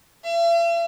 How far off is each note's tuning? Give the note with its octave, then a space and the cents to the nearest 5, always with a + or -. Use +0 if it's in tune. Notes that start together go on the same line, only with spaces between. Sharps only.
E5 +45